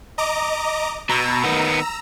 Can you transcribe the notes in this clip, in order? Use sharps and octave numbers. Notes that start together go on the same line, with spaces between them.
D#5 A#5 D6
B2 A#5 E6
D#3 B3